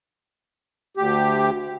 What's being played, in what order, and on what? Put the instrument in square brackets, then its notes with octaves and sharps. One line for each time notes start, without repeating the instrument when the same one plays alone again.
[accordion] D2 G4